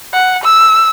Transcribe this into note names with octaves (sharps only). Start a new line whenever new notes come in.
F#5
E6